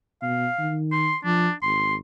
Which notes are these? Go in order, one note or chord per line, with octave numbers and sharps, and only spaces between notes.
B2 F5
D#3
C6
F3 D4
G#1 C6